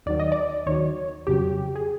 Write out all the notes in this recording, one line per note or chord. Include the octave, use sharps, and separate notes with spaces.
D#2 D#3 F#3 D5
D#5
D5
D#2 D#3 F#3 C#5
F2 C#3 F#3 G4
G#4